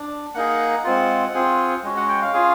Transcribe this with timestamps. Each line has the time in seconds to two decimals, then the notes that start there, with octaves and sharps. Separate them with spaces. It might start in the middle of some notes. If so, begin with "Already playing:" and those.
Already playing: D4
0.34 A#3 D#4 G#4 F#5
0.84 G#3 C4 F4
1.34 C4 F4 G#4
1.83 G#3 C#4 F#4
1.97 F#5
2.08 G5
2.21 F5
2.34 C#4 F4 G#4